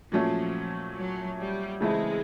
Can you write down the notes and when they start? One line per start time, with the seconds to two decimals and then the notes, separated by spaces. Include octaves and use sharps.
0.12 A#2 F3 F#3 A3 C#4
0.97 F#3
1.39 G3
1.80 C#3 E3 G#3 A3 C4 E4